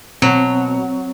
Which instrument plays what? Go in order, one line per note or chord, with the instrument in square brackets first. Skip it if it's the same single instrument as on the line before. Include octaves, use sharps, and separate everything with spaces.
[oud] B2 [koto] F#3 [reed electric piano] C4